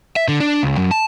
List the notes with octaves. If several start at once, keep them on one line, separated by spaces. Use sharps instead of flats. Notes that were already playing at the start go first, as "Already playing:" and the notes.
E5
D3
D4
C#2
F#2
A5